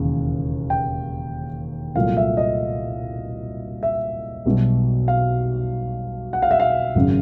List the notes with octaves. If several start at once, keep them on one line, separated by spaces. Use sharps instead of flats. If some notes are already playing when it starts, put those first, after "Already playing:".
Already playing: E1 D#2 C#3 E3
G5
C2 A#2 F#3 A3 F5
E5
D#5
E5
B1 B2 G3
F5
F#5
F5
E5
F5
G#1 F#2 C#3